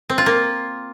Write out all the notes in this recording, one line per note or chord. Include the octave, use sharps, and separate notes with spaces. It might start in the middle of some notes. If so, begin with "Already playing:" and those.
C4
F4
A#3